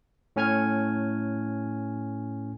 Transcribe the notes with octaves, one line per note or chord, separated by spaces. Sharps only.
A2 C#4 G#5 F6 G#6